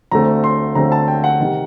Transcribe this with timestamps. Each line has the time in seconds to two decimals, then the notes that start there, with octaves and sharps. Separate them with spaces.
0.11 D2 D3 A3 C4 A#5
0.44 C6
0.75 D2 D3 A3 C4 A#5
0.92 A5
1.08 G5
1.24 F#5
1.40 C3 D#3